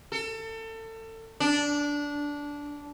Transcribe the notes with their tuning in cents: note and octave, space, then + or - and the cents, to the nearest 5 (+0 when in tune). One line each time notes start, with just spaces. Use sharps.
A4 +30
D4 -15